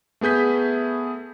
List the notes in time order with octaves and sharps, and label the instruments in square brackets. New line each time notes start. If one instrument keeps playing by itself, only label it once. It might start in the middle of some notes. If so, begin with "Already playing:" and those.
[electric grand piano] A3 B3 G#4 G6 B6